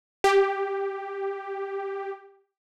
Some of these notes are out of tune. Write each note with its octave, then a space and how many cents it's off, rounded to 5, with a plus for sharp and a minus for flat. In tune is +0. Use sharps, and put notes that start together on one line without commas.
G4 +5